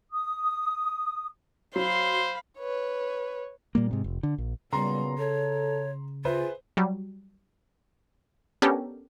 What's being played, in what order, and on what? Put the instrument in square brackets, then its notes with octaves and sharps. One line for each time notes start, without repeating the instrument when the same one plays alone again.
[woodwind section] D#6
[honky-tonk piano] F#3 [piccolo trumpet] C5 [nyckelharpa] F5 B5 [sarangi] C6
[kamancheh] B4 C#5
[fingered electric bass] A#2 G3 A#3
G#2 C3
F1
D3
A#1
[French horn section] A#2 F#3 B3 [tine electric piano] C#3 [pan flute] G3 [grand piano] A#5 C6
[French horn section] A4 [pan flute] C#5
[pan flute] F4 [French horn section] G#4 [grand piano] B4 C5 E5
[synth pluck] F#3 G3
B3 C#4 D4 G4 A4 A#4